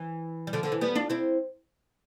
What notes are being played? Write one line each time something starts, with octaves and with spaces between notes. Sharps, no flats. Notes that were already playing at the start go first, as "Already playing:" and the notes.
Already playing: E3
G3
D3 F3
D3
E3
G3 B3
D4 F4
C4 E4